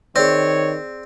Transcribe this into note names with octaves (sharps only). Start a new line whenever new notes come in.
D#3 C4 G#4 C#5 D5